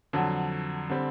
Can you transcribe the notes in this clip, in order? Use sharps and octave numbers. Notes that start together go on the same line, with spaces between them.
F2 D3 F#3
D3 G3 C4